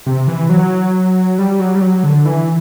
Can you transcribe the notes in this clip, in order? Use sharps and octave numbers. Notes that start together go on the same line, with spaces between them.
C3
E3
F#3
G3
F#3
G3
F#3
D3
E3